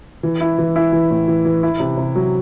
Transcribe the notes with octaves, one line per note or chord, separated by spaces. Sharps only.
E3
E4
E3
E4
E3
A2
E3
E3
E4
C3
C3
F#3